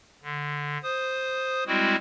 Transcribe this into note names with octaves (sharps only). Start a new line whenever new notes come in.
D3
C5 D#6
G3 G#3 C4 E4 F#4